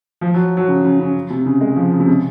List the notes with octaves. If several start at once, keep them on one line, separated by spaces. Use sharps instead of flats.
F3
F#3
F#3
C#3
C#3
C#3
C3
C#3
G#3
F3
C#3
C3
C#3